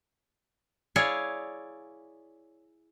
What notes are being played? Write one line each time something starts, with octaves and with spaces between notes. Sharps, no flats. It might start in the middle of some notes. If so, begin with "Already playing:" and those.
E4 G#4 C#5 D5 F5